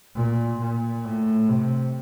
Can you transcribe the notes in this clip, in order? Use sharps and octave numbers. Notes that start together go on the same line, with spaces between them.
A#2
A#2
A2
C3